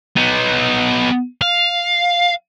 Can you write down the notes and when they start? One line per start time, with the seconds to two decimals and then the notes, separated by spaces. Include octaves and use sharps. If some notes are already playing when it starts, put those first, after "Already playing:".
0.16 B3 D#4
1.42 F5